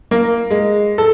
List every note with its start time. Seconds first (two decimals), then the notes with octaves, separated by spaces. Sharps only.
0.11 A#3
0.51 G#3
0.98 A4